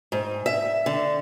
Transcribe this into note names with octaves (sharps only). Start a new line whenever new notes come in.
G#2
E5
D3